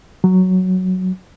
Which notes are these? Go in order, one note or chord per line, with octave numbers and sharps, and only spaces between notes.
F#3